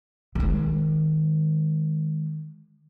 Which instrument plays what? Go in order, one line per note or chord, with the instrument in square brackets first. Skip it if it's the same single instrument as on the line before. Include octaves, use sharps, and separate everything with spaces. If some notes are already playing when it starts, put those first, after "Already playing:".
[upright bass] D#3 G#3